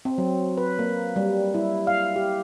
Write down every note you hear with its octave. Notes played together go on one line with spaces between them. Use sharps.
C4
F#3
B4
A#3
G3
E4
F5
G4